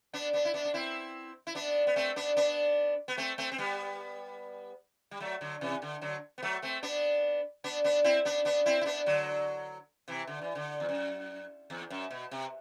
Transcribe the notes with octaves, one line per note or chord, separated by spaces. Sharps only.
B3 D4
B3 D4
E4
B3 D4
D4
C4 E4
E4
B3 D4
B3
A3 C4
B3 D4
B3 D4
B3
A3 C4
A3 C4
C4
G3 B3
G3
F#3 A3
D3 F#3
C3 E3
D3
D3 F#3
B3
F#3 A3
A3 C4
B3 D4
B3 D4
B3 D4
C4 E4
B3 D4
B3 D4
C4 E4
E4
B3 D4
D3 F#3
C3 E3
D3
E3
D3
E2
F#2
E2
F#2
B2
C3